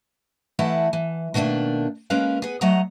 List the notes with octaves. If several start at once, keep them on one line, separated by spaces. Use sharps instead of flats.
E3 A3 E4 D#5 F#5 A5
E3
B2 D#3 A3 A#3 D4
G#3 A#3 C#4 A#4 B4 F5
B3 G#4
F#3 A3 D#5 F#5 A#5